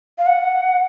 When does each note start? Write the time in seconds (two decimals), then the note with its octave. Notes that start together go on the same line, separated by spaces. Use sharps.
0.18 F5
0.26 F#5